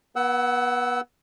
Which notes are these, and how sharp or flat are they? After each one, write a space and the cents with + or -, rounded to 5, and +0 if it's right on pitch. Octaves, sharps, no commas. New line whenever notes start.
B3 -30 F#5 +20 E6 -15